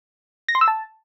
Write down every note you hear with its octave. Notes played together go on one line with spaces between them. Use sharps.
A#6
C6
E6
A5